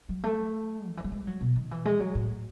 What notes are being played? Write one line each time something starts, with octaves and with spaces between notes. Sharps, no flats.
F#3
A3
D#3
E3
F#3
G#3
F#3
B2
D#3
E3
G#3
F#3
A2